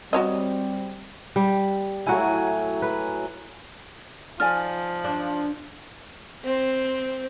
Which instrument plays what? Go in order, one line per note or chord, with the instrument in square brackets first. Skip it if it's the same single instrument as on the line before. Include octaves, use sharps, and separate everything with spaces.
[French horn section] G3 C4 [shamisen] F#4 C#5 D#5
[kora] G3
[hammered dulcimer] A2 F#3 G#5 [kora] E4 F#4
[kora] B4
[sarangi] F3 [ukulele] D#4 D5 G#5 [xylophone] F6
[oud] D4
[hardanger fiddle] C4